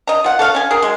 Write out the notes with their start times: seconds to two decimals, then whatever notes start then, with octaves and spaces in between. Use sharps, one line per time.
0.07 D#5 A#5
0.24 F4 F#5
0.39 A4 C#5 F5
0.55 C#4 G#5
0.71 G#4 A#4
0.82 F#3 G#3